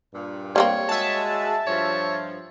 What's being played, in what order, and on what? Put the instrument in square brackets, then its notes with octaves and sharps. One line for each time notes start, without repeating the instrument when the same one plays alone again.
[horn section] G2 A#2
[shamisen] G3 A#3 C4 [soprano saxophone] C#5
[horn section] G#3 F#4 [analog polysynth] E5 A5
[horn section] G2 F3 [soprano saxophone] C#5